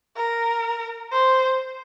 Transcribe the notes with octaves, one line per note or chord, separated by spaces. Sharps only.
A#4
C5